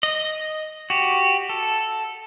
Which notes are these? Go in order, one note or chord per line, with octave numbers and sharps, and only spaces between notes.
D#5
F#4 G4
A4